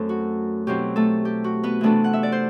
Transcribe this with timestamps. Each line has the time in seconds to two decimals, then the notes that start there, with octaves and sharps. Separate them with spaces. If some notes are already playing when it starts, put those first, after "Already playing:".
Already playing: F#2 F#3 A3 C4 A4
0.09 F#4
0.67 B2 F#3 C4 E4 G4
0.96 A3 A4
1.25 G4
1.44 F#4
1.63 B3 B4
1.81 C3 E3 A3 B3 D4 A4
2.04 F#5
2.13 E5
2.23 D5
2.32 C5